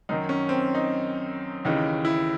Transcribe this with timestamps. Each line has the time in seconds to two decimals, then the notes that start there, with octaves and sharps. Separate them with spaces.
0.09 F#2 D#3 D#4
0.29 C#4
0.49 C4
0.75 D#4
1.65 D#2 C#3 E3 D#4
2.05 E4